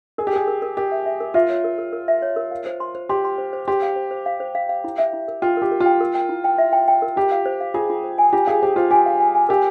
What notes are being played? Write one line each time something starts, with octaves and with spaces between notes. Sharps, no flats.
G#4 A#4
G4
G#4 A#4
A#4
A#4
G4 A#4
E5
E5
A#4
F4 E5
C#5
A#4
A#4
A#4
E5
C#5
A#4
F5
C5
C6
C5
G4 C6
C6
C5
C5
G4 C6
F5
C5
C5
F5
C5
F5
F5
E4
E5
E4
A#4
F4 G5
G4 A#4
A#4
F4
G5
A#4
G5
E4
G5
E5
G5
G5
A#4
F4 G4
F5
C5
F5
F4 G#4
F4
C5
G#5
F4 G4
G#4 F5
G4 C5
F4 C5
G4 G#5
F5
G#5
G#5
G4 A#4